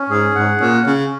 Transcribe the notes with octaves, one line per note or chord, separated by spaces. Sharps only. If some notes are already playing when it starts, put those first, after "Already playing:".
Already playing: C#4
G#2 G#4
G#2 F#5
A#2 C#4
C#3 C#4